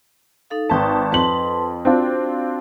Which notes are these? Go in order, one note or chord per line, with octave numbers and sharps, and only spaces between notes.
D#4 A4 F5
G#1 B4 G5 A5 D#6
F2 B4 A5 C6 F#7
C4 D4 F4 F#4